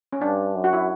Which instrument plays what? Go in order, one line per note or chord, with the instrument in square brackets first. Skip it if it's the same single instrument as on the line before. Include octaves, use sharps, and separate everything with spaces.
[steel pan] C#4
[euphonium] G2 [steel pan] D4
[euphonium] F#2
[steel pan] F#4
E4